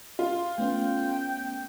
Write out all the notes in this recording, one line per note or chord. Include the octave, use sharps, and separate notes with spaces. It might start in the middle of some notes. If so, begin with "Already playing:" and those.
F4
A3 B3 C#4 G5